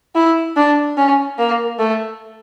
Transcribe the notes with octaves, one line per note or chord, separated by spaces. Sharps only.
E4
D4
C#4
A#3
A3